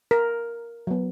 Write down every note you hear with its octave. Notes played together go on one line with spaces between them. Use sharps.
A#4
F#3 B3